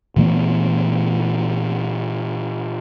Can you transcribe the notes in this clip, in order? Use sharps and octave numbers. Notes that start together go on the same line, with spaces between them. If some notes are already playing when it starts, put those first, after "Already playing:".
A#2 E3 A3 B3